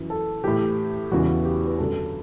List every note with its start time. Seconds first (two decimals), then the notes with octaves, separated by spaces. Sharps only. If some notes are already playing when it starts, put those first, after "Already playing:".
Already playing: F#2 E3
0.10 A4
0.44 A2 E3 G4
1.12 E2 C#3 E3 F#4
1.45 G4
1.67 B4
1.78 F#2 D3 A4